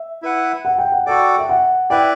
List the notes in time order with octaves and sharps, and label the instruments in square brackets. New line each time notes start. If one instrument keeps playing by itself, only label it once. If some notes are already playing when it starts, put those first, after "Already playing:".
Already playing: [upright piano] E5
[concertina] E4 B4 F#5
[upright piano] F#5
G5
F#5
[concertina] F#4 A4 D5 [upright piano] G5
[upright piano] E5
F#5
[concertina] E4 B4 D5 [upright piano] G5